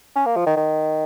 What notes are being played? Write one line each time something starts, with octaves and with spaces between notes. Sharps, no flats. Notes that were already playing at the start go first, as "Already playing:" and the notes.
C#4
A#3
F3
D#3
D#3